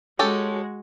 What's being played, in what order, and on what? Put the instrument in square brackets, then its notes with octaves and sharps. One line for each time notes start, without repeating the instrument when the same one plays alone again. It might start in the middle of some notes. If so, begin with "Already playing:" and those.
[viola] G#3 F#4 [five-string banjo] C#4 G4 A4